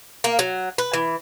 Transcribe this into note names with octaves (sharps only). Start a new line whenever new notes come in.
A#3
F#3
B4
E3